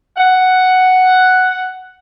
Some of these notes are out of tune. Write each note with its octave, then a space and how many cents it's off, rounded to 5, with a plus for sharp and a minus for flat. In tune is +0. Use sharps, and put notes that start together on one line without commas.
F#5 +5